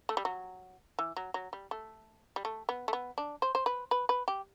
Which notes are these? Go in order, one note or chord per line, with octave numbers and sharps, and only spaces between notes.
A3
G3
F#3
E3
F#3
F#3
G3
A3
G3
A3
B3
A3
B3
D4
C5
C5
B4
B4
B4
G4